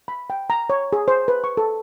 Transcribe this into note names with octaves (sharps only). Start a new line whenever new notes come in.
B5
G5
A#5
C#5
G#4
C5
B4
C#6
A4